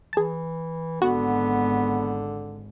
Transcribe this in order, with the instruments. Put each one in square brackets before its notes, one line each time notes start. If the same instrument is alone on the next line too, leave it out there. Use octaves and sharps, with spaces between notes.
[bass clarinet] E3 [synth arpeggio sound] G#4 A5
[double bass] G#1 [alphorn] D3 [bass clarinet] B3 [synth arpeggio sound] F#4